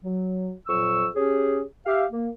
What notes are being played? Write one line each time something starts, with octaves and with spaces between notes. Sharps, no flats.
F#3
F2 A#2 F#3 C#6 E6
C#4 G4 G#4
G4 E5 F5
A#3